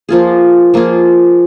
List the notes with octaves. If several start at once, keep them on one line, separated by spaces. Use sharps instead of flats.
F3 A#3 F4 G#4
F3 A#3 F4 G#4